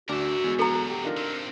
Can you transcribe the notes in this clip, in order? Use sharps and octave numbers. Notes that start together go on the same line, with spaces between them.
D2 D4 F#4 A#4 E5 D6
E2 G#3
D2 F#3 A4 A#5
G4
D4 D#4 F4 A#4
D#3 C4